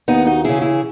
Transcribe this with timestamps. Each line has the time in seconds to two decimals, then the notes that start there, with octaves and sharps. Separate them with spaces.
0.08 D#2 B3 D#4
0.26 D#4 F#4
0.44 C#3 E3 E4 G#4
0.62 E4 G#4